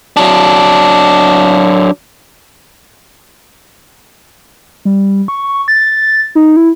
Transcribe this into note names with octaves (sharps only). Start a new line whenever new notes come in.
F#3 D4
G3
C#6
A6
D#4
E4